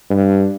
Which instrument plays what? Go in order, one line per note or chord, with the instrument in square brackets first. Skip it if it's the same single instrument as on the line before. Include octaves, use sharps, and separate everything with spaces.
[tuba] G2